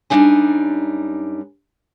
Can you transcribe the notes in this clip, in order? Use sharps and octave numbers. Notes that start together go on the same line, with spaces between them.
F#2 G3 A3 D4 D#4 G#5